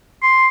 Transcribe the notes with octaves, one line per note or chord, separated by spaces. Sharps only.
C6